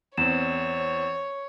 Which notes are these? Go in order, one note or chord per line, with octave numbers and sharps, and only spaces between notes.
E2 C4 C#5 E7